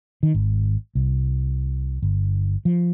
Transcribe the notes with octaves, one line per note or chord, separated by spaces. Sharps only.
D#3
G#1
C2
G1
F3